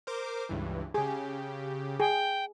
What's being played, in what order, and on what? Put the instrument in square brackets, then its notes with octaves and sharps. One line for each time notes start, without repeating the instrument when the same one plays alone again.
[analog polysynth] A#4 C5 D6
C#2 G2 E3
[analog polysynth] C#3 G4 [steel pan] G#4
[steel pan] G#4 [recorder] G5